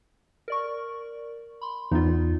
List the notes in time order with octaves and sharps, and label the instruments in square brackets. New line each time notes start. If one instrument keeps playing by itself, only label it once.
[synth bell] A#4 D5 C#6
B5 C6
[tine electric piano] E2 [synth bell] D#4 F4